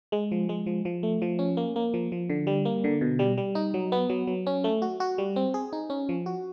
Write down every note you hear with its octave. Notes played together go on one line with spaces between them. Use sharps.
G#3
F3
G#3
F3
F3
A3
F3
C#4
A#3
A#3
F3
F3
D3
G3
A#3
D3
B2
G3
G3
D#4
F#3
B3
F#3
F#3
C#4
A3
F#4
F#4
G3
C4
G#4
D#4
C#4
F3
F#4